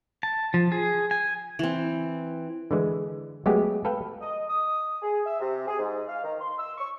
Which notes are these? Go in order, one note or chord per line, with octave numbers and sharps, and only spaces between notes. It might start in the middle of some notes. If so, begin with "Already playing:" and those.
A5
F3
G#4
G#5
E3 C4
D3 E3 G#3
F#3 G#3 A3 B3 G4 G#4
A4 B4 F5 G5
D#5
D#6
G#4
E5
C3
G#4
G#2
F5
D#3
C6
E6
C#6